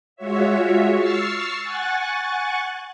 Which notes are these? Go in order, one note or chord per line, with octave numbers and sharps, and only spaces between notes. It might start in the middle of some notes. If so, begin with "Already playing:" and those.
G#3 F4 F#4 C#5 E5
C#6 E6 F6 A6 C7
F#5 G#5 C#6 F#6 A6